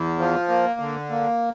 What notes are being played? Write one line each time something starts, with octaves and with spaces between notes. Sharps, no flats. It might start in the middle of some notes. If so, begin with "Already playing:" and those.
Already playing: E2
F3
A#3
D3
A#3